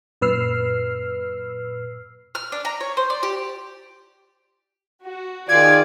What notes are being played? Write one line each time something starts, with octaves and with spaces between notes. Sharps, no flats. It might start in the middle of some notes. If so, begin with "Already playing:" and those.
F#2 A#2 B4 E6 F6 C7
F6
D4
A#5
C#5
C5
D5
G4
F#4
D#3 F4 G#4 D5 F5 G#6